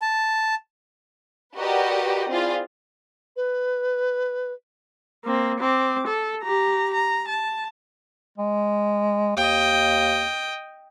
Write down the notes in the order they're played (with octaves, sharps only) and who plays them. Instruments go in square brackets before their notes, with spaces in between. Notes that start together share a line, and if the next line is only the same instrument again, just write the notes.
[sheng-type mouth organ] A5
[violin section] F#4 G4 A#4 B4 D5 D#5
C4 E4 F4 G#4 D5
[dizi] B4
[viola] A#3 C4
C4 D6
A4
G4 A#5
A#5
A5
[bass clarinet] G#3
[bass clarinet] D#2 [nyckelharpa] D#5 G5